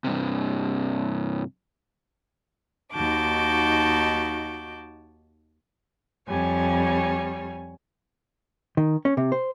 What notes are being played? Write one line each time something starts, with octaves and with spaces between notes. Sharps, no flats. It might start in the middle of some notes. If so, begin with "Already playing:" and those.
G2 C3
D#2 D#4 F#4 A5 D6 G6
F2 G3 C#5 G#5
D#3
C#4
C3
C5